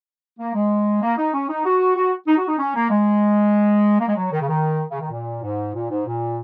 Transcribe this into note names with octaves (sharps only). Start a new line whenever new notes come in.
A#3
G#3
A#3
D#4
C#4
D#4
F#4
F#4
D#4
F#4
D#4
C#4
A#3
G#3
A#3
G#3
F#3
D#3
C#3
D#3
C#3
D#3
A#2
G#2
A#2
G#2
A#2